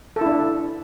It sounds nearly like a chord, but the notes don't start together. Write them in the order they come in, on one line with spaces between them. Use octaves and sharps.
A4 E4 D4